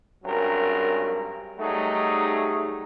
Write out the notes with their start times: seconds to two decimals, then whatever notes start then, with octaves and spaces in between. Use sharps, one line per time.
0.24 G#1 G2 F#3 C#4 A#4
1.59 F#3 G3 A3 D#4 G#4